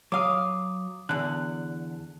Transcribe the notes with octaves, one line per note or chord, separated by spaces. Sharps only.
F#3 F5 D6 D#6
E2 D3 F#6